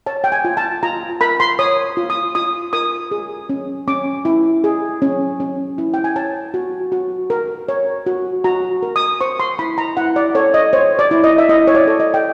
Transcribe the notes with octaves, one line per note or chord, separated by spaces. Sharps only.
C#5 A5
G5
G#5
F4
A5
F4 A#5
A#4 B5
C6
C#5 D#6
F4
D#6
F4 D#6
A#4 D#6
G#4
C#4
C#4 D6
E4
G#4
C#4
C#4
E4
G5
G#5
C#5 A5
F#4
F#4
A#4
C#5
F#4
F#4 A#5
A#4
D#6
C5 C#6
C6
E4 B5
A#5
E4 F#5
D5
A4 C#5
D#5
C5 C#5
D5
E4
D#5
E5
E4 D#5
C#5
D5
A4
D#5
G5